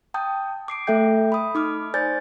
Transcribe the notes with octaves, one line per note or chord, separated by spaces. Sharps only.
G5 A5 D#6 G6
D6 C7 D7
A3 A4 E5 G5 G6
B5 D#6
D#4 D6 F6
C5 D5 G#5 G6 A6